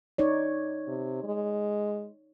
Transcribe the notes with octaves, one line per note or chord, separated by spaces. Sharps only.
D#4 C#5 D5
C3
G#3